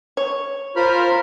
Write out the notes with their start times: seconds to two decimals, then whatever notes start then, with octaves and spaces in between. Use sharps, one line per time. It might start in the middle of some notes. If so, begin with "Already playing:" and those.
0.17 C#5
0.76 F4 A#4 C5 B5 F6